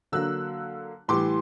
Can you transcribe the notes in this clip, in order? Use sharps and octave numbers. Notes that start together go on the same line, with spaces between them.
D3 F#3 A#3 E6 F#6
A2 E3 G3 C6 D6